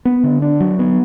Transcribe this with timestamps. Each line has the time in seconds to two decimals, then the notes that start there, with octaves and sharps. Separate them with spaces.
0.05 B3
0.24 D3
0.42 D4
0.60 F#3
0.79 B3